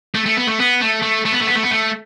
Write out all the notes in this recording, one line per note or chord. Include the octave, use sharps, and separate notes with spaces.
A3
A3
B3
A3
B3
A3
A3
A3
B3
A3
B3
A3
B3
A3